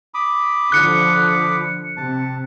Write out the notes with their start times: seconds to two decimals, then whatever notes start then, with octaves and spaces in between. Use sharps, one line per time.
0.14 B5 D6 D#6
0.72 D3 F3 F#6 C#7
1.97 C3 A5